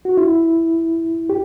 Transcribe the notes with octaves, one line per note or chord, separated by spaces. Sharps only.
F#4
E4
G4